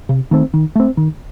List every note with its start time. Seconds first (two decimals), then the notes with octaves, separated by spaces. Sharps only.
0.09 C3
0.31 D#3 A3 C4
0.54 D#3
0.76 A3 C4
0.97 D#3